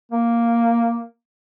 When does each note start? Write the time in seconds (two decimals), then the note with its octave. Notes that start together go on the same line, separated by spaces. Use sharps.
0.11 A#3